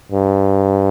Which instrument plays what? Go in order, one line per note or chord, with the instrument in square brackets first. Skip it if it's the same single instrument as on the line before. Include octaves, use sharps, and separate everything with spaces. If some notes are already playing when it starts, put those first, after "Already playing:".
[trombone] G2